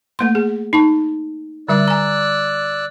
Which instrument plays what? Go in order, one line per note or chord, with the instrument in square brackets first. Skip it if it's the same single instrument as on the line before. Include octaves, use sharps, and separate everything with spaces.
[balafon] A3 A#3 C6
G#4
D#4 A5 C#6
[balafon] D3 G3 E5 [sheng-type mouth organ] D5 E6 F#6
[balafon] G#5 A#5